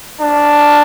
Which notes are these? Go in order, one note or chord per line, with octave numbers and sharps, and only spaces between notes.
D4